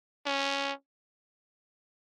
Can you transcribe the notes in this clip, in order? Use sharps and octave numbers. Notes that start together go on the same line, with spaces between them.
C#4